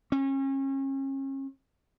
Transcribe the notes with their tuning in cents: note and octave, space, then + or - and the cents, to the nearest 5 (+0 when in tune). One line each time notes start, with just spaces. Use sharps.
C#4 -35